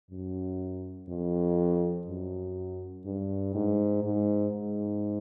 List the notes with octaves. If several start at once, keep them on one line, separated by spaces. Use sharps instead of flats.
F#2
F2
F#2
G2
G#2
G#2
G#2